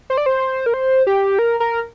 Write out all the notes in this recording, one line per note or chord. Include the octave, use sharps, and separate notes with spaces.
C5
D5
C5
A#4
C5
G4
A#4
A#4